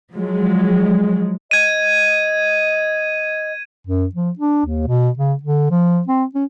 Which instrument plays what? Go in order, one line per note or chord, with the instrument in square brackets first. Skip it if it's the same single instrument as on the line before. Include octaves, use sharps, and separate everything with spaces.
[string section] F3 F#3 G#3
[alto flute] D#5 [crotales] G#6 D#7
[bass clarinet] F#2
F3
D4
D#2
B2
C#3
D3
F3
C4
C#4